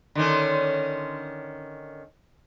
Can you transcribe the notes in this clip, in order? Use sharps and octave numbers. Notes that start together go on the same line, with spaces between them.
D3 D#3 C#4